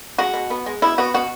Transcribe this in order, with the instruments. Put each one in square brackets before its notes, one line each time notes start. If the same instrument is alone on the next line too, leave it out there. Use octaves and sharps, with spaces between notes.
[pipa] G#3 F#4
B2
B3
G#3
B2 E4
B3 F#4
B2 F#4